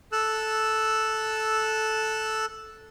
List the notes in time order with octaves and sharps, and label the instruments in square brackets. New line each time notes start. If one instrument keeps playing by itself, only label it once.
[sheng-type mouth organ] A4 E6 F#6